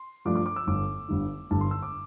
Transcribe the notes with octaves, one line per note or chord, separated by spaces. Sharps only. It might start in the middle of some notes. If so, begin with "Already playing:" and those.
Already playing: C6
G2 F3 A3 D4 D6
D6
D6
E6
G1 G2 D3 D6
G1 G2 D3
G1 G2 D3 A5
C6
E6
D6